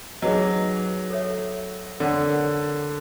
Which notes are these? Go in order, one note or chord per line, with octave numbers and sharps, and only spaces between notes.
F#3 D#4 G#4 B4 D#5
A4 C#5 E5
D3 A#4 C#5 F#5